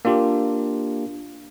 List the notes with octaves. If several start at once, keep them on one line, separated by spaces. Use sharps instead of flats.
A#3 D4 F4 G4